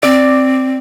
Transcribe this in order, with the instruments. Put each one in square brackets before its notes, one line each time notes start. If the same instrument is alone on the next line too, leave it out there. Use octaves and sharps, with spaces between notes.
[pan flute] C4 [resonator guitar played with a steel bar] D5